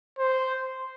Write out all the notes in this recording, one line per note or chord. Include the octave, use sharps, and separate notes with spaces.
C5